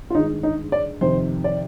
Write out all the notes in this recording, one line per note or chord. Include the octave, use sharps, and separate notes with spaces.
F4
G2 D#3 G#3 D#4
D#4
D5
F2 C3 D#3 C5
D5